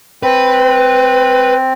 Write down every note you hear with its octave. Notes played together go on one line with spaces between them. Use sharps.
C4 B4